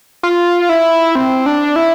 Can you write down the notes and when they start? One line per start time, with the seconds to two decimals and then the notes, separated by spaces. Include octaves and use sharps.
0.23 F4
0.69 E4
1.15 C4
1.46 D4
1.76 E4